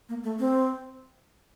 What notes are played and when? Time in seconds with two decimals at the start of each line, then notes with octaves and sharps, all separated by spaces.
0.09 A#3
0.23 A3
0.39 C4